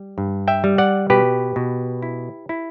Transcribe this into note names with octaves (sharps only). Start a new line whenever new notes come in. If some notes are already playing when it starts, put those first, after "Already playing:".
Already playing: G3
G2
E5 G5
G3
D5 F#5
B2 G4 B4
B2
E4
E4